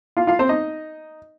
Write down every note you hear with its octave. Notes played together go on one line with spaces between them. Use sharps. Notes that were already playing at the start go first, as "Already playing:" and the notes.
F4 F5
F4 F5
C4 C5
D#4 D#5